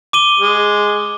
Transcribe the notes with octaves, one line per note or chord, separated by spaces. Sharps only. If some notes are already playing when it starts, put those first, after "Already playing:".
D6 D#7 G7
G#3